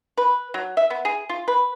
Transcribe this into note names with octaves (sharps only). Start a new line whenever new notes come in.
B4
F#3
E5
B3
G#4
F4
B4